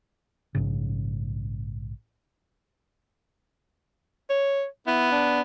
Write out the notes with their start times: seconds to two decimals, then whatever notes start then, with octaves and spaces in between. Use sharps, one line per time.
0.55 A#1 G#2 C#3
4.30 C#5
4.87 B3 E4
5.12 D4